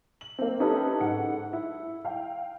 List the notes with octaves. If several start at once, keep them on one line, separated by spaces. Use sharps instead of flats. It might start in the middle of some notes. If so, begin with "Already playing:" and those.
F#7
A#3 C4
C#4 D#4 E4 G4 A4 B4
G#2 F#5
E4
F5 G5